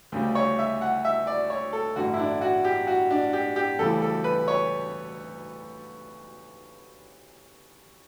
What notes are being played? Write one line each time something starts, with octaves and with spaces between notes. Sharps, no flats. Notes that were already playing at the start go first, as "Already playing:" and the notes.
D2 C#3 G3
C#5
E5
F#5
E5
D5
C#5
A4
A1 G2 D3 F#4
E4
D4
F#4
G4
F#4
D4
G4
G4
D2 C#3 E3 G3 A4
A4
B4
C#5